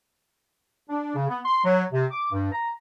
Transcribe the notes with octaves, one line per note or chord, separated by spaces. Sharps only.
D4
C#3
B3
C6
F#3
C3
D6
G2
A#5